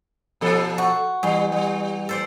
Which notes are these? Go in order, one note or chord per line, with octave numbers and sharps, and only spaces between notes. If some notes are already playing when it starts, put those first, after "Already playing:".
A#2 F3 A4
F#4
E2 G3 C6
G3
A4 C5 D5